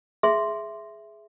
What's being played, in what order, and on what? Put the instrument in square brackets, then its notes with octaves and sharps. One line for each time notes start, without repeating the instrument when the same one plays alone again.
[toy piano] G#4 E5 C6